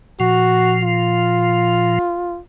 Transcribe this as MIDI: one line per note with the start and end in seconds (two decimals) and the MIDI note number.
0.20 1.99 46
0.20 1.99 53
0.20 0.77 66
0.83 2.39 65